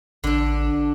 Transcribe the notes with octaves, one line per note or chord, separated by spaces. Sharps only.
A1 D3 D4